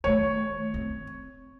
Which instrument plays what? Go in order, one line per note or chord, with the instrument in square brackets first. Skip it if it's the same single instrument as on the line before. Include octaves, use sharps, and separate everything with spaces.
[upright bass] D#3 A3 [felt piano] C#5
[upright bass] C4